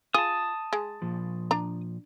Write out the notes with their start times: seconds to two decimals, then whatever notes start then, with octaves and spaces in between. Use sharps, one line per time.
0.14 F4 G#4 A5 D#6
0.73 G#3
1.02 A#2 F3
1.51 D4 A#5